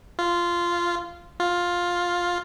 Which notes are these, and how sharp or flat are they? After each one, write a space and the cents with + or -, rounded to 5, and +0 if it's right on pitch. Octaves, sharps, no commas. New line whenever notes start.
F4 -10
F4 +10